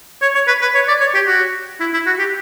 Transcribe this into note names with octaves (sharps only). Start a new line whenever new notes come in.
C#5
C#5
B4
B4
C#5
D5
C#5
G4
F#4
E4
E4
F#4
G4